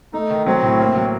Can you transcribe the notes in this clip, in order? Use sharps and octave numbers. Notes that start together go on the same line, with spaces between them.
A3 D#4
D#3
F#3 C4
A2
A#3
F#3